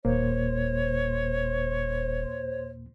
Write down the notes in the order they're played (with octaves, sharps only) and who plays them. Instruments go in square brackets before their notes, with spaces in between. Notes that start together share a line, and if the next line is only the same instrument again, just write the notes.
[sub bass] D#1 [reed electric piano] D#2 A#2 A#3 [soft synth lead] C5 [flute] C#5